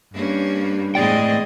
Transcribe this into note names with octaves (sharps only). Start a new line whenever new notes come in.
G2 A#3 C#4
E2 A2 G#3 C4 G#4 D5 D#5 G5